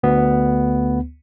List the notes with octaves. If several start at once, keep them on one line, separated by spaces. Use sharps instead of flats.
D2 B3